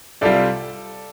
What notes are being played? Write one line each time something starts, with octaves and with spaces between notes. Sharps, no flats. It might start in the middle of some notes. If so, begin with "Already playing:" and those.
C2 C3 G3 F4 A4 D5